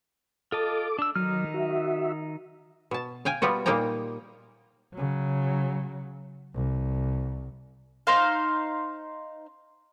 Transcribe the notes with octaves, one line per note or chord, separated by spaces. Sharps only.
F4 A4 D#5 A5 D6
D4 E6
D#3 F#3 D#4 F6
F#4 E5
B2 A5
F5 G5 G#5
G3 B3 F4 F#4
A#2 G3 A#3 D#4 G5 A#5
C#3 F#3
C2
D#4 C5 F5